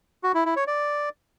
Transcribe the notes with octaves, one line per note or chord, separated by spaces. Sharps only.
F#4
E4
E4
C#5
D5